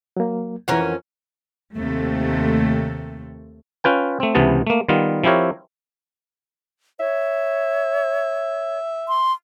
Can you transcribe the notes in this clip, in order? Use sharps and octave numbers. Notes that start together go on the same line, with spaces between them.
F#3 A#3
F2 E3 C#4 A#4 F#5
D#2 C3 A3
C#4 F4 B4 G5
A3 C4
C#2 C3 E3 B3 A5
A3 A#3
D#3 G3 B3 F4
F3 C4 E4 G4 A#4 C#5
C#5 E5
C6